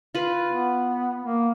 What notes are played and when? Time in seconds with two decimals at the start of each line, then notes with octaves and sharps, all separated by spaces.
0.15 F4 B4
0.49 B3
1.25 A#3